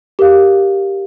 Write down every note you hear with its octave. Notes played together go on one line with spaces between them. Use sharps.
G4 A#4 F5